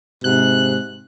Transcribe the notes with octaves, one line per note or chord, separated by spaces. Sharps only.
G#2 C3 F#6